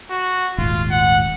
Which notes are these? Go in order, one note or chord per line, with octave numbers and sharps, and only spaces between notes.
F#4
D#1 G#1 F4
F#5